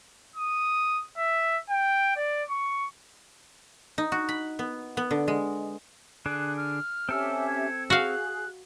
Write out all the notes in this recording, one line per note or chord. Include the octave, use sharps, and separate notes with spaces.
D#6
E5
G5
D5
C#6
D#4
F#4
B5
B3
B3
D3
G#3
D3 D4 G#4 F#6
F6
C4 C#4 G4 A4 E5 E6
G#6
F#4 G#4 F5 F#6